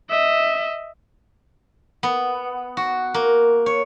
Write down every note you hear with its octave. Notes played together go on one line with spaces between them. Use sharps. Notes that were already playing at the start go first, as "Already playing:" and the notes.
D#5 E5
B3
F#4
A#3
C#5